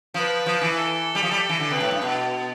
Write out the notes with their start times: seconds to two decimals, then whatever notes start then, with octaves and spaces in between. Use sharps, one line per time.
0.14 F3 B4
0.46 F3
0.61 E3
0.77 A4
1.15 G3
1.23 F3
1.31 G3
1.49 E3
1.60 D3
1.70 C3 B4
1.80 A2
1.91 G2
2.02 B2